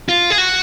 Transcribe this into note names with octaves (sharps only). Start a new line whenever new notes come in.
F4
G#4
F#4